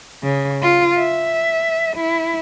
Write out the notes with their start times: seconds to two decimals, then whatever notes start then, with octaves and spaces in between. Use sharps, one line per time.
0.23 C#3
0.62 F4
0.99 E5
1.97 E4